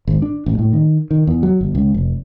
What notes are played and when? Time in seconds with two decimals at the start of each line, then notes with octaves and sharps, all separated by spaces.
0.07 G#1
0.22 D4
0.46 A1
0.59 A2
0.73 D#3
1.11 D#3
1.27 E2
1.43 F#3
1.61 G1
1.75 C#2
1.94 F1